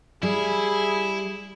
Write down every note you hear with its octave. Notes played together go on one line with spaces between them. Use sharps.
G3 E4 G#4